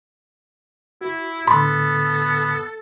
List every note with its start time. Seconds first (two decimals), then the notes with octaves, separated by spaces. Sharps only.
1.01 E4 F#4
1.47 A2 D3 B3 A4 B5 C6 D6